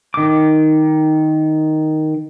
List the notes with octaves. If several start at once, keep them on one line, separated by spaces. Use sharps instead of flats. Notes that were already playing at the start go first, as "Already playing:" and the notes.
D#3 D6